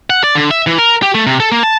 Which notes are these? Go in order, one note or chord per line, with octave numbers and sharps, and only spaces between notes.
F#5
D5
D3
E5
E3
A#4
G4
A3
C3
A4
A#3
A5